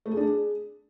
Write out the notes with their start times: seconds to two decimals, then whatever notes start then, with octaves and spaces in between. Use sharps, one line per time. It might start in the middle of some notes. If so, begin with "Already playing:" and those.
0.06 A3
0.11 G#4
0.17 D4
0.23 G#4